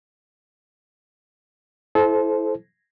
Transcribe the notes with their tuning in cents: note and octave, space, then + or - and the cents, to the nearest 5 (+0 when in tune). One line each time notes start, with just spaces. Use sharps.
E4 +0 A4 -30 C5 +0